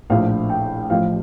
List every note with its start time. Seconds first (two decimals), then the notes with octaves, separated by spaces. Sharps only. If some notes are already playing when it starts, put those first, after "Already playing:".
0.10 A#1 A2 F3 F5
0.50 G5
0.90 A1 A2 F3 F5